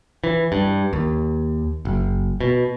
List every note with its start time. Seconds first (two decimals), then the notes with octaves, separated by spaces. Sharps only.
0.24 E3
0.52 G2
0.93 D#2
1.85 F#1
2.41 B2